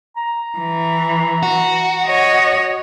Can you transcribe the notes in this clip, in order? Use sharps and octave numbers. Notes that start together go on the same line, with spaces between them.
A#5
E3
F#4
C#5 D#5